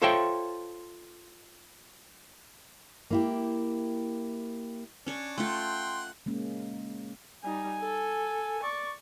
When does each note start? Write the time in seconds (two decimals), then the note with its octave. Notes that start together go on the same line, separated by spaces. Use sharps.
0.02 F4 A4 C5 C#5 E5 G5
3.10 A#3 E4 G4
5.07 C#4 D4 C#5
5.38 A3 F4 F#5 G5 C6
6.26 G#3 A#3 C#4
7.44 G3 D#4 G#5
7.79 A4
8.63 D5 C#6